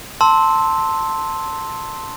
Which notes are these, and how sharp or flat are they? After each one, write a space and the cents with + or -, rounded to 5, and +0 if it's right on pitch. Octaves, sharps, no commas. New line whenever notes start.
A5 +15 C6 +0 E6 -15